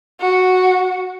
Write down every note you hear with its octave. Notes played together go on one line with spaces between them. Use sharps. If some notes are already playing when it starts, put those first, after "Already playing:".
F#4